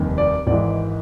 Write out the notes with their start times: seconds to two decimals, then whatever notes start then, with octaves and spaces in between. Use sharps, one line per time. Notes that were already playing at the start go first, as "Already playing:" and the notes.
Already playing: F1 D#2 D#3 G3
0.18 D5
0.47 G#1 G#2 E3 D5